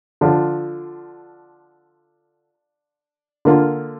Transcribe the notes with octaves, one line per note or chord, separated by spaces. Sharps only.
D3 F3 D4 F4
D3 A#3 F4